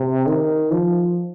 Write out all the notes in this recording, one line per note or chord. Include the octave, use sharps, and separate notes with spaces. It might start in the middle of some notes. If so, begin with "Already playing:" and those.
Already playing: C3
D#3
F3